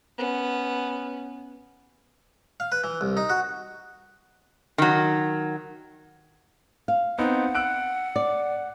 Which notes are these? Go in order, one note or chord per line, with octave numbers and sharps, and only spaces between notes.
B3 C#4
F5
B4
E3
C2
D#4
F#4
D#3 F#3
F5
B3 C4 D#4 F#5
E6 F#6 D7
D5